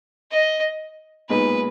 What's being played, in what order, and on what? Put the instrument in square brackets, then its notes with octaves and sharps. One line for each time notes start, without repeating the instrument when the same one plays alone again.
[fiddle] D#5
[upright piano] B1 A#2 G#3 D#4 [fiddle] B4